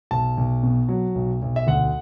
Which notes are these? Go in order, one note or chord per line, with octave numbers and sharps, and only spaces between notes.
B1 A5
B1
B2
F#3
B1
B1
E5
D2 F#5